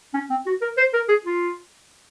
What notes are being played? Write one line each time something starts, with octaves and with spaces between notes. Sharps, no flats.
C#4
C4
F#4
A#4
C5
A#4
G#4
F4